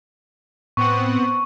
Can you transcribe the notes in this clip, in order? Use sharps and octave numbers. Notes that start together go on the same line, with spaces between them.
A2 B3 C4 F#5 C#6